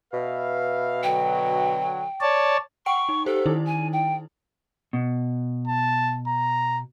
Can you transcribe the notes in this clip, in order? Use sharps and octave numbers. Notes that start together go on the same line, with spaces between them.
B2 B4 E5 F5
D3 F#3 G5
C#5 D5 A5
F#5 G5 C#6 D7
D#4
G4 A4 C5
D#3 D#4 E4
G#5
G5
B2
A5
A#5